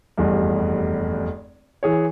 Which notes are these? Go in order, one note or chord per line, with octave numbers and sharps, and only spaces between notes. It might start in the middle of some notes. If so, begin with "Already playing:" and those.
F1 E2 G2
E3 G#4 C#5